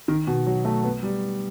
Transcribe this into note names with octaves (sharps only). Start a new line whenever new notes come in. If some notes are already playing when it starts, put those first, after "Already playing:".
D#3
B2
F#3
A3
B3
G3